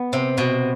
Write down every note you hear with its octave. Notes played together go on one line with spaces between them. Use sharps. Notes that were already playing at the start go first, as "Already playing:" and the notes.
Already playing: B3
C3
B2